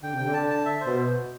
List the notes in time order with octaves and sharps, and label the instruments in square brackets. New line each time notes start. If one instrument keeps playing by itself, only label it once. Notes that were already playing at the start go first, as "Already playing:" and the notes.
[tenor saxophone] D3 [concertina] G5
[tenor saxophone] C3 [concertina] G5
[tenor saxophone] D3
[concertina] A5
A5
E5
C5
[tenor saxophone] B2